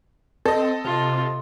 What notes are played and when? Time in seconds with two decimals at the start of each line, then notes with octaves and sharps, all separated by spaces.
0.45 C4 A4 D#5
0.85 C3 F4